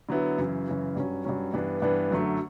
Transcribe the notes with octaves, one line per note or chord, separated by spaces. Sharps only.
D3 F#3 B3 E4
F#2 C#3 E3
F#2 C#3 E3
G2 F#3 C#4
G2 F#3 C#4
G2 E3 B3 D4
G2 E3 B3 D4
F#2 D3 F#3 A3